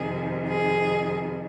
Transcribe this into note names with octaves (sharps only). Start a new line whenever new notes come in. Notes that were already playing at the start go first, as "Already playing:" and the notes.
Already playing: F2 C3 D#3 G#4
G#4